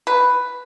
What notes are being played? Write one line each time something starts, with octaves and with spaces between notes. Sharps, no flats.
B4